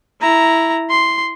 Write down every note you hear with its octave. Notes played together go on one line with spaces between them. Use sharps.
E4 A#5
C6